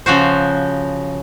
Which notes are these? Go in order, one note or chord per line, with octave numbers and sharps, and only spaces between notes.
C#3 F3 F#4 C5